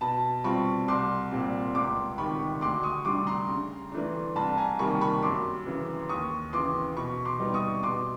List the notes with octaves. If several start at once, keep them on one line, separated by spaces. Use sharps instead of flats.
B2 A5 B5
G3 C4 F4 B5 C#6
C2 C6 D6
A#2 G3 C4
C#2 C6 D6
C3 D#3 B5 C#6
D2 C6 D6
C#6 D#6
D3 G3 C6 D6
A#5 C6
C#3
E3 A3 D4
C2 A5 B5
G#5 A#5
C3 D#3 G3 A#3 B5 C#6
B5 C#6
F#2 C6 D6
C#3 E3
D#2 C#6 D#6
C#3 E3 C6 D6
B2 B5 C#6
C6 D6
G3 B3 D#4
C#6 D#6
B2 C6 D6